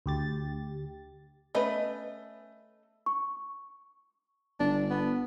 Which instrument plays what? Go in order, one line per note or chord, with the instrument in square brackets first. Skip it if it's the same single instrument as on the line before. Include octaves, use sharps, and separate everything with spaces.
[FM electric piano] D2 G4 A6
[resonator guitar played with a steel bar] A3 D#5 [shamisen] C#4 B4
[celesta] C#6
[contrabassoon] G1 [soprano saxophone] D4
[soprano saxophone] B3